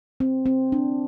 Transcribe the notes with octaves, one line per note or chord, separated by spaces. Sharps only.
C4
C4
D4